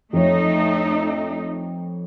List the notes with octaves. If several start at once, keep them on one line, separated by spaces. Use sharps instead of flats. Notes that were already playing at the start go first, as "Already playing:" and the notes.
F2 A3 D#4 C#5